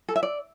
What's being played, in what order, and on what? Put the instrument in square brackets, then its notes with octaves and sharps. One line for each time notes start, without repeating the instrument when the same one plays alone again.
[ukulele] A4
E5
D5